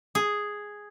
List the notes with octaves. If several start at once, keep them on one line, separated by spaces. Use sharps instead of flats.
G#4